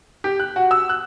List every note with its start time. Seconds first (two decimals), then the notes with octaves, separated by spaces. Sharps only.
0.24 G4
0.40 F#6
0.56 F#4
0.71 E6
0.89 F#6